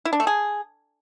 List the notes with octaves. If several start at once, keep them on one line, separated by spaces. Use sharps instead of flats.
E4
D4
A3
G#4